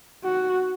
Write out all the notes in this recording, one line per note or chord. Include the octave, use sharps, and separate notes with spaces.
F#4